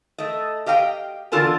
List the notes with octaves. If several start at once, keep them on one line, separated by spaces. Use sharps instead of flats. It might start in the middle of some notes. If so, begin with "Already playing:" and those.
A3 D#5
G4 D#5 F5 G5
E2 D3 F4 A4 A#4 G#5